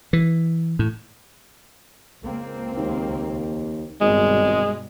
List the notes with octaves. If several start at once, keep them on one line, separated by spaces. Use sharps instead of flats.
E3
A2
C#2 A#3 C4
D#2
G#1 G2 B2 G3 G#3